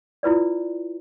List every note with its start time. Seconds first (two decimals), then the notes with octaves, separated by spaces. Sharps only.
0.23 E4 F4 B4 D5